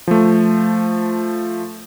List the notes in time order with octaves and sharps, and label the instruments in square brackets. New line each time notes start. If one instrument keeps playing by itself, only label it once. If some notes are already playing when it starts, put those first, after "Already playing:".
[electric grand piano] F3 A3